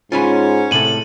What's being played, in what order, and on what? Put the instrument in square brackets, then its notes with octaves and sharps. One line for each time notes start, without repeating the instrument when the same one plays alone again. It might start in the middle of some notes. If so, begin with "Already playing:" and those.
[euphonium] G#2 [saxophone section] C#4 [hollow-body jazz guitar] F4 G#5 B5
[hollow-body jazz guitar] A2 C3 A4 [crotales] D#7 F#7